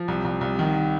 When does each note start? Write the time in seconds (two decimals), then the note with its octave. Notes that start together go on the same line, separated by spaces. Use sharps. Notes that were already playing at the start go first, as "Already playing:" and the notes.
Already playing: F3
0.08 C2
0.25 C2
0.41 C2
0.59 D#3